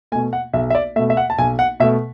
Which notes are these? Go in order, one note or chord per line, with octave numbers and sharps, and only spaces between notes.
B2 A3 G#5
F#5
B1 E5
E5
D5
B2 A3 E5
E5
F#5
A5
B1 G#5
F#5
B2 A3 E5